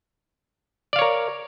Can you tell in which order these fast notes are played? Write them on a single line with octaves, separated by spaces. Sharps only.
D5 F5 C#5 A#4